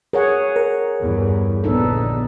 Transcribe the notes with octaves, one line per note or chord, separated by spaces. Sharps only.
G#4 A#4 C#5 F#5
A#4
E2 G2
A#1 D3 B3 D4 D#4 A4